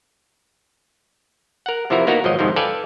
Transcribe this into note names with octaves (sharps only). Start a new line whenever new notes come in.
A#4 F#5
C3 E3 F3 E4 F#4 A#4
A#3 B3 D#4 F#4 A#4
G#1 F3 F#3 D#5
F2 G#2 C3 D#3 F3
A4 B4 D5 F5 G5 G#5